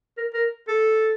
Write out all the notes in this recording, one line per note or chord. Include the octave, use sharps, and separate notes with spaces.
A#4
A#4
A4